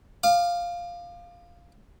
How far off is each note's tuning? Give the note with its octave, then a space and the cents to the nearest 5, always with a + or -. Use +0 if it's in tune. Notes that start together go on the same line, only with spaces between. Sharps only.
F5 +0 D6 +40